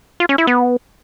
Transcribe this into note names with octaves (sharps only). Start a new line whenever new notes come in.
F4
C#4
E4
B3